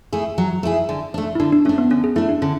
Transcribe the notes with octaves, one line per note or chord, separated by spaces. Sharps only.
A3 E4 G#4
F#3
A3 E4 G#4
D3
A3 D4
E4
D3 D4
D4
A3 C#4 D4
B3
D3 C#4
G#4
A3 D4 E4
D4
D3 C#4